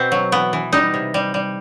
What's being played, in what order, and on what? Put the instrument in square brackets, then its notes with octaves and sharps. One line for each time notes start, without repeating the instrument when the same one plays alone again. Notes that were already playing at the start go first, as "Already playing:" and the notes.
Already playing: [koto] B2 C4
F#3
E3 B3
E3
G3 D#4
C3
G3
G3